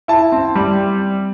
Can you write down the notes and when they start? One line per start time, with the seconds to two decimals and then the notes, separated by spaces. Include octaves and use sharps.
0.08 E4 A5
0.32 C4
0.55 G3